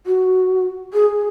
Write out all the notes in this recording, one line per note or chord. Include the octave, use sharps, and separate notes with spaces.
F#4
G#4